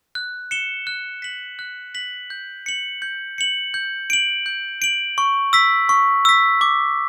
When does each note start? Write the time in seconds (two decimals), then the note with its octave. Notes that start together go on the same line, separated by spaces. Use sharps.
0.15 F#6
0.51 C#7 E7 G7
0.87 F#6
1.22 B6 F#7
1.59 F#6
1.95 B6 F#7
2.30 G6
2.66 C#7 F#7
3.02 G6
3.38 C#7 F#7
3.74 G6
4.10 D7 F#7
4.46 G6
4.82 D7 F#7
5.18 C#6
5.53 E6 B6
5.89 C#6
6.25 E6 B6
6.61 D6